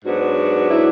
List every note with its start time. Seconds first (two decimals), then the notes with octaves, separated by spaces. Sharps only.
0.05 G#2 F#3 B3 D4 F#4
0.70 E4